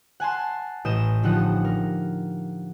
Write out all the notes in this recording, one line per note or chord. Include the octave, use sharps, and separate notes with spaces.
F#5 G#5 A5 C6
A1 D#5 G6 E7
D3 F3 D#4 G4 F#5 D#6
A#4